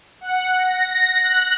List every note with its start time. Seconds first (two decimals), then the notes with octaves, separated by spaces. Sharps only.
0.21 F#5
0.57 A#6
1.13 F#6